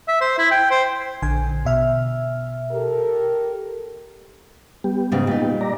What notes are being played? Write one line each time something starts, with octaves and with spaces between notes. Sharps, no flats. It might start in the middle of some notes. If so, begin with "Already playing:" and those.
E5
C5
E4
G5
C5
A#1 D3 G#5
B2 E5 F6
G4 A4 A#4
G3 B3 G4
G#2 C#3
A#2 D#4
D5 A#5